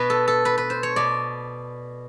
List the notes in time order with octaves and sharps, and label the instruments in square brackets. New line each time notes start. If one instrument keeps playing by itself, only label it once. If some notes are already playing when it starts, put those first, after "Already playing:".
Already playing: [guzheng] B2 B4
A4
A4
B4
B4
C5
C#5
B2 D5